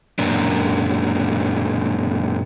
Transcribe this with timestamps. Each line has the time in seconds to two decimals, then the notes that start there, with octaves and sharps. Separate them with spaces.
0.19 F#2 A#2 D4